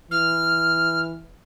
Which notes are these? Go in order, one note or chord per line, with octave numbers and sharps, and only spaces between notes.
E3 F6